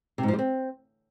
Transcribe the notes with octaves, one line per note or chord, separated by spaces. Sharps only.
C3
G#2
F3
G3
C4